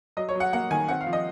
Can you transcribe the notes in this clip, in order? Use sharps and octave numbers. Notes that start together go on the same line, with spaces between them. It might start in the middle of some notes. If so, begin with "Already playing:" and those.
F#3 D#5
C#5
F#3
F#5
A#3 F#5
D#3 G#5
C4 F#5
F5
F3
D#5